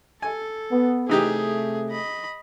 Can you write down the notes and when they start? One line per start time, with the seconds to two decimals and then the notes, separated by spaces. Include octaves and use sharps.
0.22 A4 G#5
0.71 B3
1.09 C3 E3 A3 D#4 G4 G#4
1.91 D#5 B5